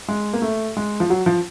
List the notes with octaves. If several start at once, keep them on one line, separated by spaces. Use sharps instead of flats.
G#3
A#3
A3
G#3
F3
F#3
F3